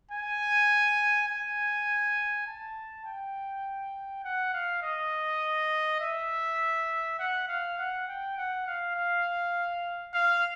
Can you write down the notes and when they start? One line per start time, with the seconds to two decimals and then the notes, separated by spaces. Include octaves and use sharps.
0.11 G#5
1.28 G#5
2.47 A5
3.05 G5
4.24 F#5
4.54 F5
4.83 D#5
6.01 E5
7.19 F#5
7.48 F5
7.79 F#5
8.08 G5
8.37 F#5
8.67 F5
8.95 F5
10.14 F5